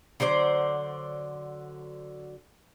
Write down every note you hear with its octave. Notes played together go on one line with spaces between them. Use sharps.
D3 F#3 C5 D5